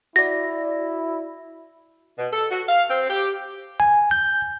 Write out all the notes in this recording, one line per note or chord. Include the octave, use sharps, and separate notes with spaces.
E4 F#4 D5 A#6
B2
A4
F#4
F5
C4
G4
G#5
G6